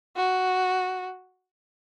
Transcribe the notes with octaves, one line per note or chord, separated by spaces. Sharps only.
F#4